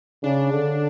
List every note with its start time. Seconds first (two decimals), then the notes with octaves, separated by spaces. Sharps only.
0.23 C#3 D4
0.52 D3